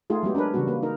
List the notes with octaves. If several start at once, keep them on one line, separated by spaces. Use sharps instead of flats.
A3 D#4 F4 G#4
F#3 G#3 B3 G4
C#4 D4 A#4 B4
C#3 E3 G3 B3 F#4
A#3 B4
D#4 A#4